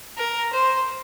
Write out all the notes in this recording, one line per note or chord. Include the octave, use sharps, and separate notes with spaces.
A#4
C5